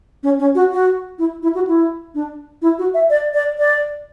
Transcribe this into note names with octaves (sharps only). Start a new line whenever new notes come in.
C#4
C#4
F#4
F#4
E4
E4
F#4
E4
D4
E4
F#4
E5
D5
D5
D5